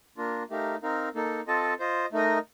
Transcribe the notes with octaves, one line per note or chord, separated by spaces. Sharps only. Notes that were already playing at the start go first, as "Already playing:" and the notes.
A#3 D4 F4 A#4
A3 D#4 G4 A#4 F5
C4 D#4 A#4 F5
A#3 D#4 A4
C4 F4 A4 D#5 A5
F4 C5 D#5
A3 D#4 A#4 D#5